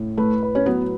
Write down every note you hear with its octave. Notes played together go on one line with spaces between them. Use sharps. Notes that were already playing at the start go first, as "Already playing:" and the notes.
Already playing: A2
A3 B4
B4
C#4
F#3 B3